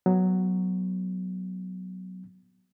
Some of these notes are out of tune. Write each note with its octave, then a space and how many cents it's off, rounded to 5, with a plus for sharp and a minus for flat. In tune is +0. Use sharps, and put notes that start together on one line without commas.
F#3 +0 B3 +0